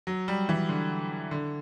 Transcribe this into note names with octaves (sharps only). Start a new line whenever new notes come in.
F#3
G3
E3
D3
D3